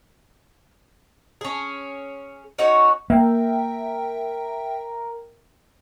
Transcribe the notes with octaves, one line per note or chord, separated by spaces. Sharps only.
C#4 G#4
C#4 D#4 F#4 C#5
A#3 A#4 E5 G5